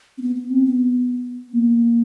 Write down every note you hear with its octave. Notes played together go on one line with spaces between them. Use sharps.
C4
B3
B3
C4
B3
A#3